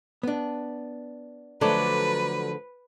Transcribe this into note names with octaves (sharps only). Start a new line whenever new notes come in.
B3 D4
D3 F3 F#3 A3 A4 B4 D5